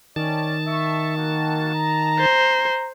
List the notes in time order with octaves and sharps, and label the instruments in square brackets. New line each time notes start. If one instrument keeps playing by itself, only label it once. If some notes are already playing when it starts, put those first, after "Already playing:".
[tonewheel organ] D#3 A5 [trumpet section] C#4 D5
[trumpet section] E5 C#6
A#3 F#4
A#5
[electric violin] C5